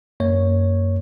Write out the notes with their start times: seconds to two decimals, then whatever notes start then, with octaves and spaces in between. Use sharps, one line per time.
0.20 F#2 A#3 C#5